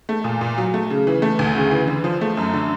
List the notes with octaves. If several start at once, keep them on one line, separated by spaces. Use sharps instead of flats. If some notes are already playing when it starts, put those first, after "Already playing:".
A3
A#2
A#2
F#3
A3
C#3
E3
A3
D2
C#3
E3
D3
F3
A3
F#2
D3